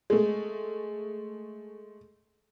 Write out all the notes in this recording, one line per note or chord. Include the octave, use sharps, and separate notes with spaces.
G#3 A3